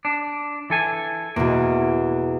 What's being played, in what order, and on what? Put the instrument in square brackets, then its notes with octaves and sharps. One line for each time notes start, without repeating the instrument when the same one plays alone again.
[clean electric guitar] D4
E3 A4 G#5
[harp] E2 B2 [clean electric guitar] A#3